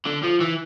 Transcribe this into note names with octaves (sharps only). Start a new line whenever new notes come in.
D3
F3
E3